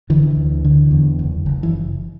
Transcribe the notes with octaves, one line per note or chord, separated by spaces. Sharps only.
D3 E3
D2
D3
E2
F#1
F#1
E3